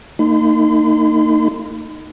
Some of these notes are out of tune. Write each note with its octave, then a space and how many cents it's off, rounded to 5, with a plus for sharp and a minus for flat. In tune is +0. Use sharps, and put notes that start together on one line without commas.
A#3 -40 D#4 -5 C6 -45